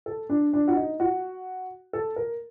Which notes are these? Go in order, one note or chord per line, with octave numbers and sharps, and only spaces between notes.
A4
D4
D4
F#4
D#4
F#4
A4
A#4